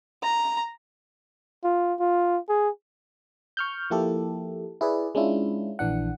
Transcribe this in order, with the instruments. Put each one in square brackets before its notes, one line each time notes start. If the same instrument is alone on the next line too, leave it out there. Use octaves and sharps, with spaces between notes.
[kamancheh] A#5
[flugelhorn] F4
F4
G#4
[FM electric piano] C#6 F6 G6
F3 A#3 E4 G4 A4
E4 G#4 B4 D5
G#3 C#4 D4 E4 F4
A#1 E3 D4 F#5